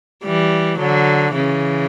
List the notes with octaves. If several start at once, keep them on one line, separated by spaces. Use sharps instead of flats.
E3 G3
D3 F#3
C#3 E3